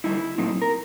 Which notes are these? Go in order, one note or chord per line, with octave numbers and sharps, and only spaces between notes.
D3 G3 C4 D#4 E4
A#2 F#3 A3 C4 D#4
A#4